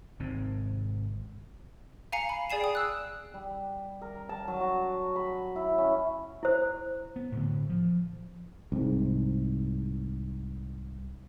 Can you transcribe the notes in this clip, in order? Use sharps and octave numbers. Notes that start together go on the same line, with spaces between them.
G#1 G#2 C3 C4
F5 G#5 A#5 C7 C#7
B5
G#4 D5 G#5 C7 E7
G5 D#6
E6 F#6
G3
A#4
A5
F#3
F#4
B5
E4
C#4
E4 C5
B3
A2 D3
F3
C2 G#2